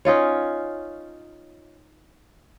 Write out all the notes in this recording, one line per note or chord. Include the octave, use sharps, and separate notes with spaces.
C#4 D#4 F4 C#5